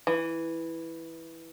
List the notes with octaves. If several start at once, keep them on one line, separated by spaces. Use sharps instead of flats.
E3